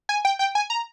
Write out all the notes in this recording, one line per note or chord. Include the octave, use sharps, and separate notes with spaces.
G#5
G5
G5
G#5
A#5